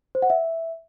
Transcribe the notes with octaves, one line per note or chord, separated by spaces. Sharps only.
C5
F#5
E5